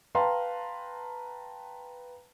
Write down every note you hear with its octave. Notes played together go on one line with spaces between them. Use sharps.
B4 F5 G5 A5 A#5 C6